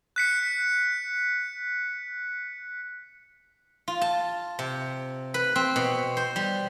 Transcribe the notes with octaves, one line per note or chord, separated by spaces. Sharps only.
F#6 B6 C#7
F4
A5
C3
B4
C4
B2
C5
G3